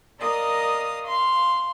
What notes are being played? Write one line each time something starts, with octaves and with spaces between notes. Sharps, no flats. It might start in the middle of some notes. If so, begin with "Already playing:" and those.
A#4 D5 D#5 F5 D#6
F5 C6